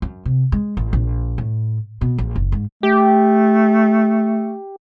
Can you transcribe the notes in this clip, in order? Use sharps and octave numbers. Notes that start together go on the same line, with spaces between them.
F#2
C3
G#3
A1
A#1
A2
B2
A#1
F#1
G#2
A3 G4